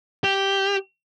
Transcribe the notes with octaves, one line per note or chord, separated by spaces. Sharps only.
G4